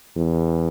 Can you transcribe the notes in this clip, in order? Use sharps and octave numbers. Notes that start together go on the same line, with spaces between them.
E2